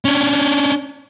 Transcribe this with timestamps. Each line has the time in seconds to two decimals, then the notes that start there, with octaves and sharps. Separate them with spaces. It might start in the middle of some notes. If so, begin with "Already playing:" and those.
0.05 C#4 D4